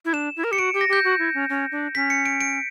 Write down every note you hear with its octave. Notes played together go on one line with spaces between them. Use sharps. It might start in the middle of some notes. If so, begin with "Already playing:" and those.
E4
D4 E7
E4
A#4
G4 C#7
F#4 D7
G4
A#6
G4 G6
F#4
E4
C#4
C#4
D4
C#4 B6
C#7
D7
D7